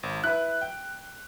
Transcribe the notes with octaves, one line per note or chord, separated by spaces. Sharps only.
G#1
E4 B4 F#6
G5